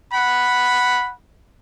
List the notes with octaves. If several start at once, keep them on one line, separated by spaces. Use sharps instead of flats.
F#5 B5